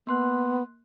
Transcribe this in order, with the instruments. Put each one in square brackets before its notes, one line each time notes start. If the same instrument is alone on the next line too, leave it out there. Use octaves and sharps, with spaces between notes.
[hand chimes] A#3 C6 F#6 [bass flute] B3